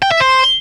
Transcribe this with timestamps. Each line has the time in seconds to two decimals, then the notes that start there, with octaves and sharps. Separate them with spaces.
0.02 G5
0.11 E5
0.20 C5